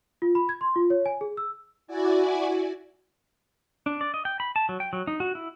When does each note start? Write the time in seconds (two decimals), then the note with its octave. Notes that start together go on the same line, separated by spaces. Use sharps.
0.22 F4
0.35 B5
0.49 G#6
0.61 C6
0.76 F4
0.90 C#5
1.06 G#5
1.21 G#4
1.37 E6
1.87 E4 F#4 D5 G#5
3.86 D4
4.01 D5
4.14 D#5
4.25 G5
4.40 B5
4.56 A5
4.69 F#3
4.80 G5
4.93 F#3
5.07 D#4
5.20 F#4
5.35 E4